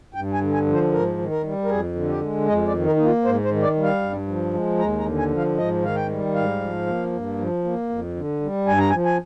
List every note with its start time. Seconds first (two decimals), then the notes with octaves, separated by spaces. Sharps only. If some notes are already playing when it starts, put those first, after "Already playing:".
0.14 G2 G5
0.33 G#5
0.41 D3
0.53 G#5
0.66 F3
0.73 C5
0.91 G#2 A#4
1.18 D#3
1.30 A#4
1.44 G3
1.64 A#4
1.69 F2 G#4
1.95 D3
2.09 G4
2.21 G#3
2.47 F2 D#5
2.67 D5
2.73 D#3
2.85 A#4
2.96 A#3 D#4
3.05 F4
3.25 G#2 C5
3.44 C5
3.50 D#3
3.63 D5
3.76 G3
3.83 F5
4.02 G2
4.28 F3
4.54 G#3
4.79 D#2 A#5
4.99 A#5
5.05 D3
5.18 G#5
5.31 F3
5.37 F5
5.57 G#2 D#5
5.82 D#3 F5
5.95 G5
6.09 G3
6.34 G#2 F5
6.60 F3
6.86 A#3
7.12 G2
7.38 F3
7.64 A#3
7.89 F2
8.16 D3
8.41 G3
8.66 G2 G#5
8.78 A#5
8.90 G#5
8.93 F3
9.05 G#5